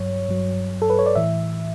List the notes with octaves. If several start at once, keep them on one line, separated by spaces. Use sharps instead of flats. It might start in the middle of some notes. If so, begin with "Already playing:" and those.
Already playing: G2 F#3 C#5
G2 F#3
A4
B4
C#5
D5
A2 E3 E5